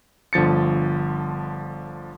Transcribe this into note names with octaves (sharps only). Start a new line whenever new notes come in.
G1 D3 F3 A6 C#7